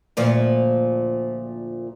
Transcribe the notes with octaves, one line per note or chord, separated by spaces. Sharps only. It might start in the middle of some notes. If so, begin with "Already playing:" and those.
D2 A#2 F3